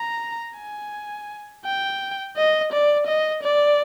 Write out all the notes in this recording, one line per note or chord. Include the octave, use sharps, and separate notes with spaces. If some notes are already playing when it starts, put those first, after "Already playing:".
Already playing: A#5
G#5
G5
D#5
D5
D#5
D5